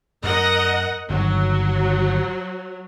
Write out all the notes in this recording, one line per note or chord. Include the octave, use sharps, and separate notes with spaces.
F#2 A#4 D#5 F#5
G1 G2 D#3 F#3